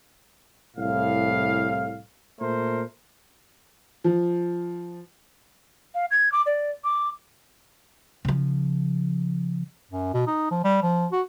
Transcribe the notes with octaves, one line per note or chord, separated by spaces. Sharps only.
C2 A2 F5
A#2 A3 A#4 C5
F3
F5
G#6
D6
D5
D6
C#3 F3
F#2
B2
D#4
F3
G3
F3
F#4